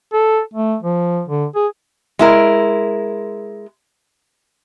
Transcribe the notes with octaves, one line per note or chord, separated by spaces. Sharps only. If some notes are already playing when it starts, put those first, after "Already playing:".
A4
A3
F3
D3
G#4
G#3 E4 A#4